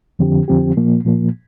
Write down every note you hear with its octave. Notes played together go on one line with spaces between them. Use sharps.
F2 D3 F3 C4 G4
F2 D3 F3 C4 G4
A#2 F3 A#3
A#2 F3 A#3